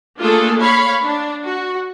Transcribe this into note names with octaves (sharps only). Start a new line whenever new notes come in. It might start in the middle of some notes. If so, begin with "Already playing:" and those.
A3 A#3 D4 F4 G#4 A4
C#5 F5 B5
D4
F#4